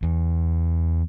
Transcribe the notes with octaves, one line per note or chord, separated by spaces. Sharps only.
E2